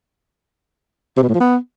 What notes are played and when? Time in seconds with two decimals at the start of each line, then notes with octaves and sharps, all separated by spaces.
1.17 C3
1.23 B2
1.28 A2
1.34 F3
1.40 B3